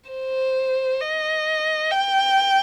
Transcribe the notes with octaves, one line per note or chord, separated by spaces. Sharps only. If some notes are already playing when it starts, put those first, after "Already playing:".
C5
D#5
G5